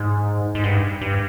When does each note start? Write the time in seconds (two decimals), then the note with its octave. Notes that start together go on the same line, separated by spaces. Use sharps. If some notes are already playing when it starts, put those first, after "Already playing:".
Already playing: G#2
0.55 G#2
0.64 G2
1.01 G2